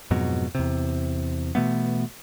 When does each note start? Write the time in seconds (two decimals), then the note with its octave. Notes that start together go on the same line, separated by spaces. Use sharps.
0.11 F2 G#2 B2 F#3
0.55 E2 C3
1.55 B2 E3 A3 B3